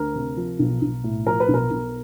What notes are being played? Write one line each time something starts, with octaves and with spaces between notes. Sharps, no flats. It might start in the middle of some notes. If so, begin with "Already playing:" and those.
Already playing: D2 A#4
C3
F3
B1
B1
A2
F3 A#4
B4
B1
A#4
B1